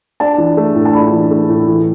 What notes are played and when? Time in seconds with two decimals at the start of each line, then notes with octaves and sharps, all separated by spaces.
0.20 D4 A5
0.38 E3
0.57 A3
0.76 A2
0.85 A5
0.94 D4 B5
1.13 E3
1.31 A3
1.49 A2
1.68 E3